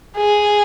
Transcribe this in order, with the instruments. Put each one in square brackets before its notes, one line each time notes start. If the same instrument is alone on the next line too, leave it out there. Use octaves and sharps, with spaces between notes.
[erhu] G#4